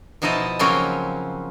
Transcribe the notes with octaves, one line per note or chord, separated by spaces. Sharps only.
B2 F3 D#4 E4 D#5 A5
C#3 F3 F#3 A#3 C4 C#4